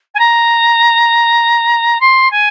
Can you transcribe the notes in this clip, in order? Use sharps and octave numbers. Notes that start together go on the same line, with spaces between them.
G#5
A#5
C6
G#5